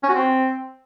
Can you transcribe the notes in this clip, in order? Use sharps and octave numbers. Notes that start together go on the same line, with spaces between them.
C#4
F#4
C4